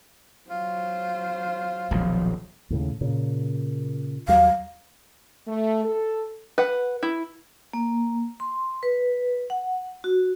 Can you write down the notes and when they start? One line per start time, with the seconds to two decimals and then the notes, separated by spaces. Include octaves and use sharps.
0.50 F#3 F4 C5
1.91 D#1 B1 F3
2.70 D#2 A2 C#3
3.01 A#2 C#3
4.28 D#2 F#3 G3 F5
5.48 A3
5.85 A4
6.58 B4 F#5
7.03 E4
7.73 A#3
8.40 C6
8.83 B4
9.50 F#5
10.04 F#4